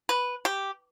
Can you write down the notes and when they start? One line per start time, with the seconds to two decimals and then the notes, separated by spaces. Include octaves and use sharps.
0.09 B4
0.45 G4